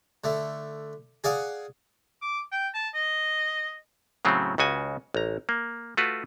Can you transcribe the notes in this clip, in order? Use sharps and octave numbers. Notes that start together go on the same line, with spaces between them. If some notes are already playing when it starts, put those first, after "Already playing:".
D3 A3
G#4 D5 F5 F#5
D6
G5
A5
D#5
A2 C#3 F#3 A3 C4
C#2 C#3 F#4 G#5
A1 A#5
A#3
A3 F4 F#4 B4